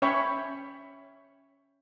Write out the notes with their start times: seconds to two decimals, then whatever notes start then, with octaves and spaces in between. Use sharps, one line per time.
0.02 C#4 C#5 E5 G5 B5 C#6